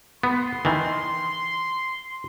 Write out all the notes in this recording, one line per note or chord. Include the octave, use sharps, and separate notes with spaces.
B3 C6
D#3 E3